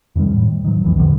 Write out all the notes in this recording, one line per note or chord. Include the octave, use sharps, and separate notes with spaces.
F2 C3 D#3 G3
A2
D#3 F#3
B1 F2 E3
E2 B2 D3 E3